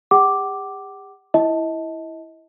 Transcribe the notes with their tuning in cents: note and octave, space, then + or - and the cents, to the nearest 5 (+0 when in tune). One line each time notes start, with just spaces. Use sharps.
G4 +45 F#5 +40 D6 +0
E4 +0 D#5 +35 A5 +0